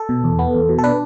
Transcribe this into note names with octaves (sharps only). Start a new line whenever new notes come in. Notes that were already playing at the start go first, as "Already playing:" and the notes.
Already playing: A4
B2
E2
B3
E2
B2
A4
D4 B4